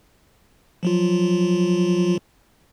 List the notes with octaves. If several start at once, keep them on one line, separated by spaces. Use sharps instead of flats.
F3 F#3 F4